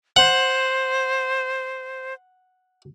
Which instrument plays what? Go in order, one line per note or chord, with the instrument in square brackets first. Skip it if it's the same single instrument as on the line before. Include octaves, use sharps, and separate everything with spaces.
[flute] C5 [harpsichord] F#5